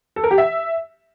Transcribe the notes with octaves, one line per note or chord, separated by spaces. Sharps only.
A4
A#4
G4
E5